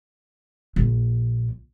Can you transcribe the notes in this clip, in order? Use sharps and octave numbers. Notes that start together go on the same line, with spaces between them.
A#1